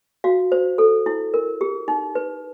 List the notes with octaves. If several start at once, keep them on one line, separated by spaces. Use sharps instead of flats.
F#4 F5
C5
A4
E4
A#4
G4
D#4
B4